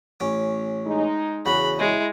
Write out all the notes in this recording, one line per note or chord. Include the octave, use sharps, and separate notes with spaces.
A1 C#4 D6
G#3 D#4
E2 C#3 F#4 B5
G#3 E4